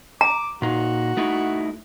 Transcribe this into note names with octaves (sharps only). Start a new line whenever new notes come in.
A#5 D6
A#2 D#4 F#4
A3 D#4 E4